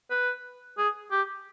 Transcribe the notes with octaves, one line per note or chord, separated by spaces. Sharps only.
B4
G#4
G4